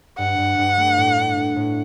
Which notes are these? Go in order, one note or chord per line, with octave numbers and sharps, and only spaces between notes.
G2 F#5
G2
G2
A3
A2
D4
A2
A2